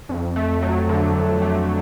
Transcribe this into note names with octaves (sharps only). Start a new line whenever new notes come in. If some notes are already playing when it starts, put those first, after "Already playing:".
F2
A3
F#3
D3
F2
A3